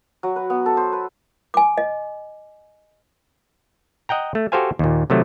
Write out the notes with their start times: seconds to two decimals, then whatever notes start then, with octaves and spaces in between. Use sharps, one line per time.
0.23 F#3
0.36 B4
0.50 B3
0.66 A4
0.77 C5
0.93 B4
1.54 G#5 D6
1.78 D#5
4.09 D#5 F#5 G5 A#5
4.35 A3
4.52 F#4 G4 A4 C5 F5 G#5
4.79 D#2 A#2
5.10 C3 D#3 F#3 A3